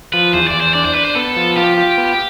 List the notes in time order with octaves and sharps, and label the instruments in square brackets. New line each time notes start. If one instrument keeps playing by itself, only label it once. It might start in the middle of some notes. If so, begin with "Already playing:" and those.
[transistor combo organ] F3 [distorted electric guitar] B4
[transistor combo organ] E2 [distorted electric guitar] C5
[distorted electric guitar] D5
[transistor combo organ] E2
[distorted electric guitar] C5
[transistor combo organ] D4 [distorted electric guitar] D5
[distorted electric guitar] C5
[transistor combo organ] D4 [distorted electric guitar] B4
[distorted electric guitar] C5
[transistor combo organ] B3 [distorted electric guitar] A4
[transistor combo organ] F3
[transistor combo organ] F4 [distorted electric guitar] G4
[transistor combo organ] F4
B3